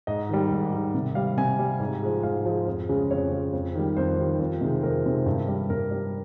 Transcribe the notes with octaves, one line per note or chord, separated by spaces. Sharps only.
G#2 D#5
D#3 G3
G#2
D#3 G3
C3
G3 F5
C3 G#5
G3
G#2
F3 G#3
G#2 F5
F3 G#3
F2
C#3 G#3
F2 C#5
C#3 G#3
F2
D#3 G3
F2 C5
D#3 G3
F2
C3 D#3 G#3
F2 A#4
C3 D#3 G#3
G2
G3
G2 A#4
G3